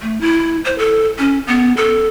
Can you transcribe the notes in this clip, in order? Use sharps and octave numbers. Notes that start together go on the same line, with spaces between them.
A3
E4
C5
A4
C#4
B3
A4